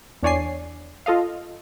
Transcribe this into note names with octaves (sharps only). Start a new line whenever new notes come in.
E2 D4 C#5 D5 G#5 C7
F4 A4 D#5 F5